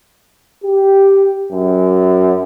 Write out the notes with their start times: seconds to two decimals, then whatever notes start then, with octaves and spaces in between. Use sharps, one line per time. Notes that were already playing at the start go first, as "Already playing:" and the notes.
0.64 G4
1.52 F#2